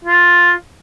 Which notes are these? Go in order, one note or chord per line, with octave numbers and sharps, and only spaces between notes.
F4